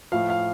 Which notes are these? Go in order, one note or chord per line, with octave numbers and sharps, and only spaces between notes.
A2 F3 F5
F5